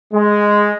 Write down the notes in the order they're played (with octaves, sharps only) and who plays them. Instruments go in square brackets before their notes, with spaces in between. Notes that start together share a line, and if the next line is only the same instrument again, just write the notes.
[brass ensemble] G#3